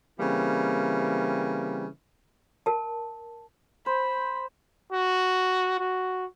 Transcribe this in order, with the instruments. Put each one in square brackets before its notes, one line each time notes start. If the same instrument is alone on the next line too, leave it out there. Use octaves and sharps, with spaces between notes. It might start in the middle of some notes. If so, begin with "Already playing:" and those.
[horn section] C#3 E3 G3 A#3 C4
[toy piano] A#4 A5
[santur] C5 [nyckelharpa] B5
[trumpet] F#4
F#4